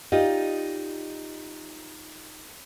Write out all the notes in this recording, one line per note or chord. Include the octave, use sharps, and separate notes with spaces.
D#4 F4 G4 D5 D#5